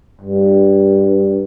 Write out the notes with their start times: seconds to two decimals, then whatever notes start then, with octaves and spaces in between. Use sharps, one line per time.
0.21 G2